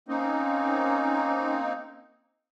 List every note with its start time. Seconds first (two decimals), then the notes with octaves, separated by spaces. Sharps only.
0.08 A#3 C4 C#4 D#4